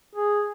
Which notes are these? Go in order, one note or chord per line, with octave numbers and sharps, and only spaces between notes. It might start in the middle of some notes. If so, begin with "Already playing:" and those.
G#4